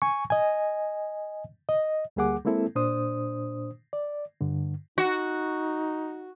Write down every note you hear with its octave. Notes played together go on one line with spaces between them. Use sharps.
G#5 C#6
D#5 G#5
D#5
D2 G3 A#3 G#4 F#5 D6
G#3 A#3 C4 E4 A4
A#2 D4 C5 D#6
D5
G2 D3
D#4 F#4